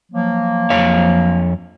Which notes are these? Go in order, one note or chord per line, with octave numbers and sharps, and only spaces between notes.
F3 F#3 A#3
F2 C#5 F5